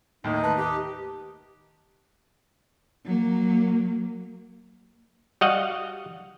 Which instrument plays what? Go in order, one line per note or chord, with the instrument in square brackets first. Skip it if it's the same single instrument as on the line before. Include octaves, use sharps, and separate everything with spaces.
[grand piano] D#2 A2 [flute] D#4
[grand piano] D#3 [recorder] B4 [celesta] A5 F#6
[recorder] G4
[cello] F#3 A#3
[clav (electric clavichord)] G3 F#4 D#5 F5 F#5